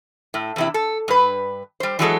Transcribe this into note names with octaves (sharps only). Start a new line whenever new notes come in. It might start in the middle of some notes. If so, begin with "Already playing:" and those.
A2
E2 C3 E4
A4
G2 B4
G3 C5
E3 F#3 G#3 A4